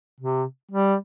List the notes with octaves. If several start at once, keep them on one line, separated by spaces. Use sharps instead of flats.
C3
G3